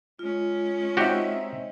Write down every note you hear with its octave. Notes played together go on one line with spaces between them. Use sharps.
G#3 C#4 F4
C4 D#4 F#4 G4 E5